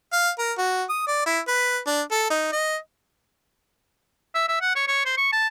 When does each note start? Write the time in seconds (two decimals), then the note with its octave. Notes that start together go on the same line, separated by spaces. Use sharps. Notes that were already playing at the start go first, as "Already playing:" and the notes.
0.13 F5
0.39 A#4
0.58 F#4
0.89 D#6
1.08 D5
1.26 E4
1.48 B4
1.87 D4
2.11 A4
2.30 D#4
2.52 D#5
4.34 E5
4.48 E5
4.61 F#5
4.75 C#5
4.88 C#5
5.05 C5
5.17 C#6
5.32 A5